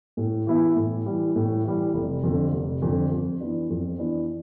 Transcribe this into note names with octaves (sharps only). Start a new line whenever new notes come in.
A2
E3 B3 E4
A2
E3 G3
A2
E3 G3
F1
F2 D3
F1
F2 D3
F2
E3 B3 D4
F2
E3 B3 D4